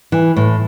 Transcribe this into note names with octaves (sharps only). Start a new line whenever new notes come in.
E3
A2